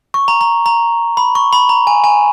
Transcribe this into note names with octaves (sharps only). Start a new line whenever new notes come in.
C#6
A#5
A#5
A#5
B5
C#6
B5
A#5
G#5
G#5